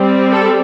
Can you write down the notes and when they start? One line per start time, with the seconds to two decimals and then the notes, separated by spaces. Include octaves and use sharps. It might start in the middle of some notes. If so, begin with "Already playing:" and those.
Already playing: G3 C4
0.32 A4